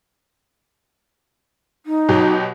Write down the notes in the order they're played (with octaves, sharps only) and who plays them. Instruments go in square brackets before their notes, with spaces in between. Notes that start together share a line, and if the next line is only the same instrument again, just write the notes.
[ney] D#4
[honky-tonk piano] B2 F#3 G4